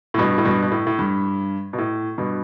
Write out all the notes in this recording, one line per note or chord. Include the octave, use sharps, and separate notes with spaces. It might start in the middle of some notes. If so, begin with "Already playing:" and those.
A2
G2 B2
A2
G2 B2
B2
A2
A2
G2
B2
A2
G2 B2